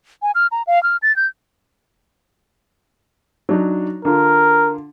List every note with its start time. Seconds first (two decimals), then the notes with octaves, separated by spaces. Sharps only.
0.22 G#5
0.35 F6
0.52 A#5
0.67 F5
0.83 F6
1.02 A6
1.16 G6
3.49 F#3 D4 D#4
4.05 D3 F4 A#4